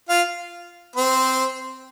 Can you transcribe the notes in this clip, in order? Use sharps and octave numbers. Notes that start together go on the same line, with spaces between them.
F4 F5
C4 C5